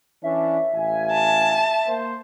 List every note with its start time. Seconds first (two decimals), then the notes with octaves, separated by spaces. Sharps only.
0.24 E3 C#4 D4 E5
0.74 A1 F5 G#5
1.12 A5
1.87 A#3 C5